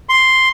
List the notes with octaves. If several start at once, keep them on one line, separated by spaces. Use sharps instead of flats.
C6